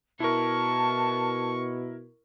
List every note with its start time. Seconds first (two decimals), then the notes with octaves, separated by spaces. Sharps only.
0.20 B2 E4 A#4 A5 C#6